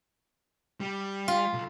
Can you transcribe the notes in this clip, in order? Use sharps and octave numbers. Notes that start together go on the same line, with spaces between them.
G3
F4
B1